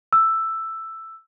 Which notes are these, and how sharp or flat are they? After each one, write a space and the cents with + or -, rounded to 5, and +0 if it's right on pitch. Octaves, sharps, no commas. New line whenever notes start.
E6 +5